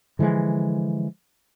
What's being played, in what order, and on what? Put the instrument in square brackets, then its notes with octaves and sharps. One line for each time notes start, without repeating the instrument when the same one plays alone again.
[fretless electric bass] D3 E3 F3 G#3